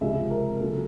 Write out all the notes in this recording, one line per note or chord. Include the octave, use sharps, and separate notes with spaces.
C#2 C3 F3 G#3 E5
A#4
C#3 F#3 A#3 A4